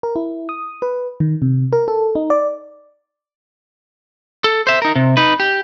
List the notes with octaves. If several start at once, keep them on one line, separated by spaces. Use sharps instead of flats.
A#4
E4
D#6
B4
D#3
C3
A#4
A4
D#4
D5
A4
C5 E5
D#4 A#4
C3
D#4 B4
G4